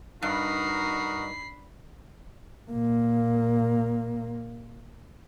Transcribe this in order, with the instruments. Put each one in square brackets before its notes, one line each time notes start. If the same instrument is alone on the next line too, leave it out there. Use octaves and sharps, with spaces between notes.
[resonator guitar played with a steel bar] G2 [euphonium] D#4 [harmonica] F#4 A#4 D#5 [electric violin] B5 C7
[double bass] A#2 A#3